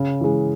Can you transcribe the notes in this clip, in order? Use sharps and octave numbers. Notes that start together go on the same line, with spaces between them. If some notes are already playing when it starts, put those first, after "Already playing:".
Already playing: C#3
E3 G#3